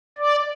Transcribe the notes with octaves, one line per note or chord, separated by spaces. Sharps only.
D5